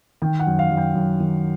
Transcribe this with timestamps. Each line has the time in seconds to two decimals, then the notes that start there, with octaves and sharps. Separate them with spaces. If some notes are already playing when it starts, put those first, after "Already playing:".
0.22 D#3 G5
0.40 F#5
0.47 F#2
0.59 F5
0.71 F#2
0.77 G5
0.95 F#2
1.20 D#3